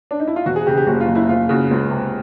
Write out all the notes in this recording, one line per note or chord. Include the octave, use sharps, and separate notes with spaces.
D4
D#4
E4
F4
E1 F#4
G#4
C#3 G4
G4
F#1 F#4
F4
F#1
E4
F#1 F4
C#3 F#4
C#2
C3